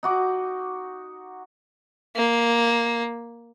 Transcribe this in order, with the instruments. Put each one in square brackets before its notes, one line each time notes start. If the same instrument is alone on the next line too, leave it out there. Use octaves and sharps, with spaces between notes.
[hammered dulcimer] D#4 F#4 D6
[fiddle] A#3